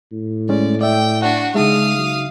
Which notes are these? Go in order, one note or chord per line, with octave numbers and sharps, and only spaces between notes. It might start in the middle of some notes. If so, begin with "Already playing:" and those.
A2
G#3 C#4 D5
D5 E5 G5
D4 F#4 F#5
C#3 G#3 D#4 E5 F5 D#6
F#3